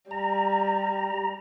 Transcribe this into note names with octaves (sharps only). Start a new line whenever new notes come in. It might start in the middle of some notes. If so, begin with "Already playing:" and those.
G3 A#5